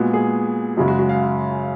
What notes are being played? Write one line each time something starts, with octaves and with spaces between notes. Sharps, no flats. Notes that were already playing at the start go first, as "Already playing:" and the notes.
Already playing: A#2 G#3 B3 F#4
G#4
F#2 C#3 G#3 F#4
F#4
F#4
F5